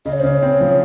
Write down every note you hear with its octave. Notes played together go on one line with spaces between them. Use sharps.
C#3 D#5
C#5
C5
C#3 C#5
C4
F3